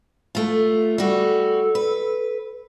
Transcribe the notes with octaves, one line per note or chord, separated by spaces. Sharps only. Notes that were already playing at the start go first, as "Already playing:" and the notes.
A3 F4
G3 F#4 A4
B4